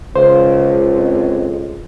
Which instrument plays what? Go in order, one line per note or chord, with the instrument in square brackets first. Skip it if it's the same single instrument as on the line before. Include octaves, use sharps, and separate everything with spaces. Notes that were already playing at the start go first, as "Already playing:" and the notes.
[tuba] C#2 [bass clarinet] C#3 [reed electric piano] C5
[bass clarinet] F2